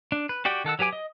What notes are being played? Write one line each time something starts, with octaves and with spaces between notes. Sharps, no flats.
D4
B4
F#4 G4 D5 G5
D#3 A4 F#5 E6
F#3 G4 B4 G#5 D6
D#5